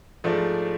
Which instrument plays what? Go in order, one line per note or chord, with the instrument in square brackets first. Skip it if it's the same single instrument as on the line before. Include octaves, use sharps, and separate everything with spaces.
[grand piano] G#2 F3 A3 D4